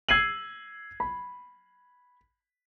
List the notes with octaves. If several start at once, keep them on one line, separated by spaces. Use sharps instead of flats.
E6 G#6 C7 D#7 F#7
B5